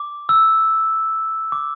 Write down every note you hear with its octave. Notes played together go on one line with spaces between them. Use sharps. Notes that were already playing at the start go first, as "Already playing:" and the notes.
Already playing: D6
E6
D6